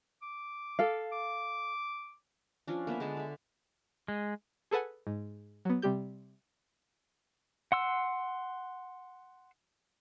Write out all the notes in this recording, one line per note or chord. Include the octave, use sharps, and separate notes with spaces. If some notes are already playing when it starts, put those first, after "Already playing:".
D6
A4 F5
D6
F3 C#4 D4
A#3 B3 E5 A5
D3 G#3 D4 A5
A4 E5
G#3
G#4 A4 B4 F#5 G#5
G#2
F#3 B3
C3 G3 G4 G6
F#5 C6 E6